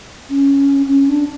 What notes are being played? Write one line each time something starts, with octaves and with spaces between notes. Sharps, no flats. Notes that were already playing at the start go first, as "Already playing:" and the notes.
C#4
C#4
D4